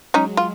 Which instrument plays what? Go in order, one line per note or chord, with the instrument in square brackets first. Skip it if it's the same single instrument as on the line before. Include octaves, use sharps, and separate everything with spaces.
[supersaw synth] F#3 G#3 [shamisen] C#4 D#4
[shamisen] F4